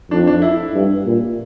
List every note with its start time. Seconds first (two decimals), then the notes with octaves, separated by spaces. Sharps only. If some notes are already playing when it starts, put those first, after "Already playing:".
0.11 F2 D4
0.27 D4
0.42 E4
0.74 G2
1.06 A#2